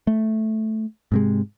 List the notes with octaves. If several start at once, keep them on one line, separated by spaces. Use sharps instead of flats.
A3
G#2 C3 G#3